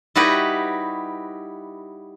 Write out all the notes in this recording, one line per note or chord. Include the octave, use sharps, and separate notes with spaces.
G3 D#4 E4 F#4 G4 B4